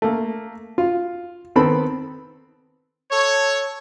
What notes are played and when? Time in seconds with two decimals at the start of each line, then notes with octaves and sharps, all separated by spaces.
0.02 A3 A#3
0.78 F4
1.56 D#3 B3 C4 A4 B5
3.11 A4 C#5